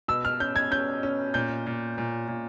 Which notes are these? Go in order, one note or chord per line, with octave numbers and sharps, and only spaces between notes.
B2 E6
F6
C#4 G6
G#6
C#4 G6
C#4
A#2 G6
A#2
A#2
A#2